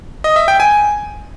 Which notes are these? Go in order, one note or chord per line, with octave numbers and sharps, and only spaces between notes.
D#5
E5
G5
G#5